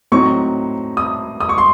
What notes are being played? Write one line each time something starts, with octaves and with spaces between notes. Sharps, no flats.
A2 F#3 C4 D#4 C#6
D#6
D#6
C#6
C6